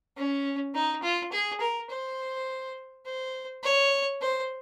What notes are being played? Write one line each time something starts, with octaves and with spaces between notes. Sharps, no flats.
C#4
D#4
F4
G#4
A#4
C5
C5
C#5
C5